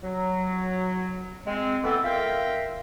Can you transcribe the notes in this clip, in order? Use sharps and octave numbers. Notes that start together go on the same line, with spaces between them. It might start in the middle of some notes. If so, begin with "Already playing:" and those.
F#3
G#3 C4
E3 B3 C4 A4
F4 A#4 E5 F5 G5